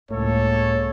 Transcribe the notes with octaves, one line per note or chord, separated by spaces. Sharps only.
C#2 A2 A#3 A4 C#5